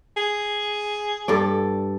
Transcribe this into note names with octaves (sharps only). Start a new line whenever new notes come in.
G#4
G2 A4 D5